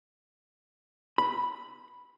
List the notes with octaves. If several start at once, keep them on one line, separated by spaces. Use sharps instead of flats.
B5